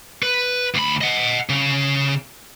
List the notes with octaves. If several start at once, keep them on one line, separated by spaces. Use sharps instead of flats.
B4
D2 B5
D#5 F#5
C#3